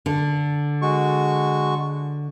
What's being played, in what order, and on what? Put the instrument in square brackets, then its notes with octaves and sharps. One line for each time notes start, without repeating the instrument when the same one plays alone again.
[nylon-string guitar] D3
[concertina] G#3 F#4 C#6